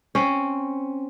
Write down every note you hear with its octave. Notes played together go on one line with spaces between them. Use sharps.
C4 C#4